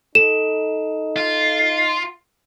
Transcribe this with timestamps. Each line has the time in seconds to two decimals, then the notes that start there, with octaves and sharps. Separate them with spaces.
0.15 D#4 A4 E7
1.16 F4